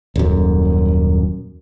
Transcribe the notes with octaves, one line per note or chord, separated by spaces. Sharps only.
D#1 F#2